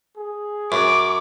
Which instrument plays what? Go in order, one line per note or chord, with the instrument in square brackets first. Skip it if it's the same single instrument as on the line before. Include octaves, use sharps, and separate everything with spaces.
[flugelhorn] G#4
[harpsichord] F#2 [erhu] D6